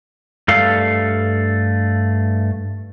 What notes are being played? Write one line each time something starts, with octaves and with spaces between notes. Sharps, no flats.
G2 A3 A4 F5